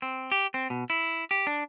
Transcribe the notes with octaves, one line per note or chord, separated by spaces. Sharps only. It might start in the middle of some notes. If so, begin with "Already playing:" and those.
C4
G4
C4
B2
E4
G4
D4